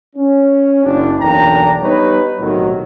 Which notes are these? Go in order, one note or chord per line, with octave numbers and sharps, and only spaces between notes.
C#4
F#1 F#2 D4
B1 E2 A#3 D4 G5 A#5
G3 B3 D#4 B4 C#5
B1 A2 C3 D#3 F#3